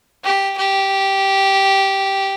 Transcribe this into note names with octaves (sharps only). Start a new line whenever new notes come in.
G4
G4